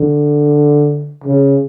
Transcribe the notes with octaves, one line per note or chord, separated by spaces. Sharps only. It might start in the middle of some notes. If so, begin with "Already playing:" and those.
Already playing: D3
C#3